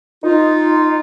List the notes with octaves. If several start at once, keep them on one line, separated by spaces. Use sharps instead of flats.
D#4 F4